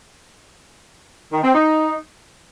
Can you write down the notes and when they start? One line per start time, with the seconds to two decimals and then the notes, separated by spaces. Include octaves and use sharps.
1.32 D#3
1.43 C4
1.55 D#4